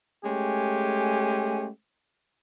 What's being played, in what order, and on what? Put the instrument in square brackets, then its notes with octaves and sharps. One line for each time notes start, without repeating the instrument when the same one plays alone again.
[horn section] G#3 A3 C#4 G4